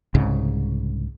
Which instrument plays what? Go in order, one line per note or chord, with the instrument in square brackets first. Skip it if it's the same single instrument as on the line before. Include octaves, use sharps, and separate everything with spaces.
[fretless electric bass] C2 G#2 C#3